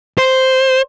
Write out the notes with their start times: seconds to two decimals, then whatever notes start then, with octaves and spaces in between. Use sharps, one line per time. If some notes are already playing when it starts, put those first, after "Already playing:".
0.18 C5